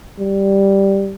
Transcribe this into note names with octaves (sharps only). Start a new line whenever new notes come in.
G3